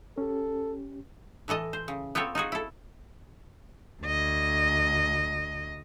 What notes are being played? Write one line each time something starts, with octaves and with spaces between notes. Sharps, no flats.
C#4 G4 A4
A2 E3 A4 D#5
C5
C#3
B3 C4 F4 A4 C#5
D#4 F4 F#4 G#4
E4 A4
D2 D#5